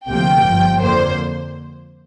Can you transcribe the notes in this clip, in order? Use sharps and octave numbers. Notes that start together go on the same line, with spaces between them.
D2 C3 F3 A#3 G5
G1 G2 F3
F2 D3 F3 A#3 C5